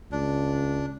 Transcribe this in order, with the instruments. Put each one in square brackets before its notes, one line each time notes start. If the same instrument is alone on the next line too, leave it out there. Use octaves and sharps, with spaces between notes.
[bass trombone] C#2 [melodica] D4